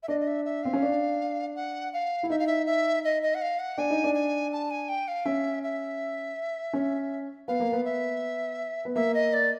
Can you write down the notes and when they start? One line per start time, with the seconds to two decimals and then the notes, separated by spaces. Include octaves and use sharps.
0.02 E5
0.08 D4 D#5
0.20 D#5
0.27 E5
0.45 E5
0.63 C4 F5
0.73 C#4
0.82 D4
1.55 F#5
1.93 F5
2.23 E4
2.30 D#4 E5
2.38 F5
2.46 E5
2.66 E5
3.04 D#5
3.22 D#5
3.34 F#5
3.41 F5
3.59 F#5
3.78 D4 G#5
3.90 D#4
4.04 D4
4.14 G#5
4.52 A5
4.70 G#5
4.88 G5
5.07 F5
5.25 C#4 E5
5.63 E5
6.73 C#4
7.47 B3 F5
7.60 A#3
7.73 B3
7.84 E5
8.85 B3
8.95 A#3 E5
9.14 D#5
9.33 D5